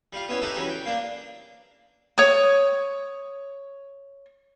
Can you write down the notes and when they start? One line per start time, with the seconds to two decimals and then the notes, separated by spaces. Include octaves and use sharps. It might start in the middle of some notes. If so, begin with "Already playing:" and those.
0.13 G3 F4
0.28 B3 C#4 E4 C#5
0.42 D#4 G4 A4 E5 F#5
0.55 E3 F#3 G3 C#4
0.69 G5
0.85 A#3 D4
2.18 C#5 D#6